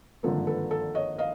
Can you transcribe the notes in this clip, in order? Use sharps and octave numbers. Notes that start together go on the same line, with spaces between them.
G#1 G2 D3 F3 A#3 A4
A4 B4
A4
C#5 D#5
D#5 F5